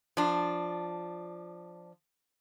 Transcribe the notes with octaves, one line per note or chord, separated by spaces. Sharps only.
F3 D4